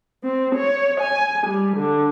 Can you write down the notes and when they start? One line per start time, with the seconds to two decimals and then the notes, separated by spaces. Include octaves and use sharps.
0.24 C4
0.55 C#5
1.00 G#5
1.46 G3
1.77 D3